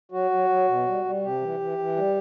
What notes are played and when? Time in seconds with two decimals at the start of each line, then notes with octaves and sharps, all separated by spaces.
0.12 F#3 F#4
0.31 F#3
0.49 F#3
0.68 B2
0.86 G3
1.04 G3
1.23 C3 G4
1.41 E3
1.60 E3
1.78 E3
1.96 G3